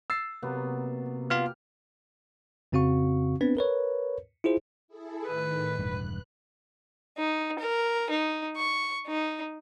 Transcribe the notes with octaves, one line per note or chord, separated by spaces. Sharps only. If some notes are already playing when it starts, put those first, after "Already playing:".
E6 A6 C7
C3 F#3 A#3 B3
B3 F4 G4 F5 F6
F2 C#3 C4 F#4 F5 C#6
B3 C4 D4 B4
A#4 B4 C#5
E4 F4 G#4 C5
E4 G#4 A4
A2 D#3 B4
E1 G2 F#6
D#4
A#4
D#4
C#6
D#4